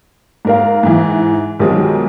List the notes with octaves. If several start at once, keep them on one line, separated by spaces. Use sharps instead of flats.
G#2 A#4 F5
G#2 E3
B1 D#3 F3 G3 G#3